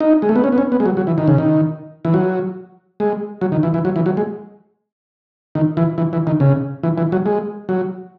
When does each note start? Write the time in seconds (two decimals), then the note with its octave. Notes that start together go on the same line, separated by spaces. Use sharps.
0.01 D#4
0.22 G#3
0.29 A3
0.36 B3
0.44 C#4
0.52 B3
0.58 C#4
0.72 B3
0.80 G#3
0.86 F#3
0.97 F#3
1.07 E3
1.18 D#3
1.28 C#3
1.38 D#3
2.05 E3
2.14 F#3
3.00 G#3
3.41 F#3
3.52 D#3
3.63 E3
3.74 E3
3.85 F#3
3.96 E3
4.06 F#3
4.17 G#3
5.55 D#3
5.77 E3
5.98 E3
6.13 E3
6.27 D#3
6.40 C#3
6.83 E3
6.98 E3
7.12 F#3
7.26 G#3
7.69 F#3